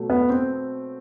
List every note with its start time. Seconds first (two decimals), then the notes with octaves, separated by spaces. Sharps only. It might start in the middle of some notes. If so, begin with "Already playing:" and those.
Already playing: B2 F#3 A3
0.10 B3
0.30 C4